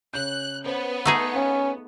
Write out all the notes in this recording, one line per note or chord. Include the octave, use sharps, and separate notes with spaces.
C#3 C#4 F#6 G6
B3 C#4 C5
A3 D#4 G#4 E6
C#4 B4 F5